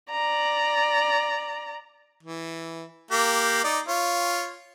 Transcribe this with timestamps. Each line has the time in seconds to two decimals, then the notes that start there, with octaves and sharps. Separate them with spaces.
0.11 D5 A#5
2.23 E3
3.11 A#3 G4
3.64 D#4 D5
3.88 F4 C#5